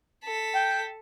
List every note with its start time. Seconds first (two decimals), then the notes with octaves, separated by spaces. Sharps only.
0.24 A4 B6
0.55 G5